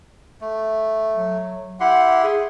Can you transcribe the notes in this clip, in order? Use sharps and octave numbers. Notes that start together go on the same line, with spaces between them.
A3
F#3
E4 G4 F#5 C6
G#4